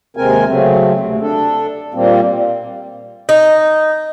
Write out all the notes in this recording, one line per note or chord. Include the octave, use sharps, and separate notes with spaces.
D#2 C3 G#3 C4 A#4 G#5
C#3 F#3 A3 C4
D2 C3
D4 A4
A#2 G3 A#3 C4
D#4